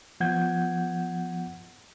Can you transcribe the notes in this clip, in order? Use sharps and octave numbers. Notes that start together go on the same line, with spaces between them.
F3 B3 F#5 G6 G#6